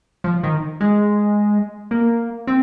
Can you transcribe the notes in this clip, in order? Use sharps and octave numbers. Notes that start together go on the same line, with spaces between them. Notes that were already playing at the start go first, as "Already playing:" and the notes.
F3
D#3
G#3
A#3
C4